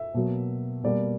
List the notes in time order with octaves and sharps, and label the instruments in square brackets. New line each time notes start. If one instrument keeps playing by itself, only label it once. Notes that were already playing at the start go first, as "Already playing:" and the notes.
Already playing: [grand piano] E5
B2 F#3 A#3
B2 G3 A#3 D5